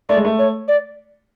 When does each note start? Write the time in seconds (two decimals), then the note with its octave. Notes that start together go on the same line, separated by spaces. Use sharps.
0.09 A3 D5
0.16 G#3
0.25 A3
0.39 C#5
0.68 D5